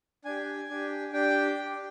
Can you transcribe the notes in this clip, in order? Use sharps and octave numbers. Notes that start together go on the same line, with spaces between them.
D4 G4 G#5
D4 G4
D4 G4 G5
D4 G4